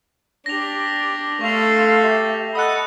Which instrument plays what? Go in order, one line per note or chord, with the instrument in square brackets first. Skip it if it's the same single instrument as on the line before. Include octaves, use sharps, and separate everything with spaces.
[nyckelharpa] D4 G4 [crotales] A#6 F7
[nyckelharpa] A3 A4 [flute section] F5 C6 [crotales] C#6 F7
[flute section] G4 E5
[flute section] A4 F#5 B5 [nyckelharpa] D#5 [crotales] D#6 F#6